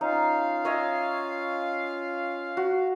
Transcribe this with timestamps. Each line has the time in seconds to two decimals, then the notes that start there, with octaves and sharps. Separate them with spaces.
0.01 C#4 D#4 F4 F5
0.65 C#5 D#5 E5
2.57 F#4